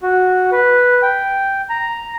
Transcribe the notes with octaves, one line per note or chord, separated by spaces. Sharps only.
F#4
B4
G5
A#5